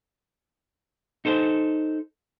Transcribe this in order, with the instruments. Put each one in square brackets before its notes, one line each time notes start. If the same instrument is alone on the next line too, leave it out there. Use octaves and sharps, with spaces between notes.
[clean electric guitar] D#4 A4 C5